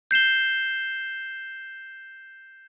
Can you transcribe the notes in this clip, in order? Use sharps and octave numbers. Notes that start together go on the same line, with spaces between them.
G6 C7 E7 G7